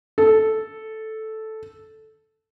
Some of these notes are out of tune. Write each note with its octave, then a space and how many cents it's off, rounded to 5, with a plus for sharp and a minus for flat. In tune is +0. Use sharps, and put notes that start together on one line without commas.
A4 -5